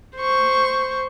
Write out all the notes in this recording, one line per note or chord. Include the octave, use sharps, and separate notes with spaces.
C5 C#6